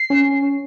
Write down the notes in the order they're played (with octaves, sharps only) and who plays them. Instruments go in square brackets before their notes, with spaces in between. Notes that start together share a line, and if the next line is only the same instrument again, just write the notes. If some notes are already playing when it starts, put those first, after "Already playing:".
Already playing: [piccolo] C7
[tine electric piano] C#4